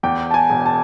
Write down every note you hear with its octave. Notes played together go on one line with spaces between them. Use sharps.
E2 G5
A5
G#5
E1
A5